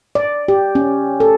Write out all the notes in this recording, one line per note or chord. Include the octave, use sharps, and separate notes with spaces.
D5
G4
C#4
A4